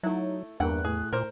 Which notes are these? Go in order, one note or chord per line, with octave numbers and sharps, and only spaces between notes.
F#3 A3 D#4 E4
E2 G2 A#3 F#5 G5 B5 F#6
A2 G#4
A#2 A#4 C5